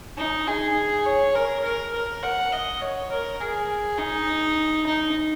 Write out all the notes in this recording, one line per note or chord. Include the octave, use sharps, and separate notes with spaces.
D#4
G#4
C#5
A#4
A#4
A#4
F#5
D#5
C#5
A#4
G#4
D#4
D#4